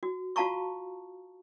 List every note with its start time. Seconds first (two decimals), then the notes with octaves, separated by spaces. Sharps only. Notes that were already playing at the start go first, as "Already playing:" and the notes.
0.03 F#4
0.36 F4 F#4 F5 A5 A#5 C#6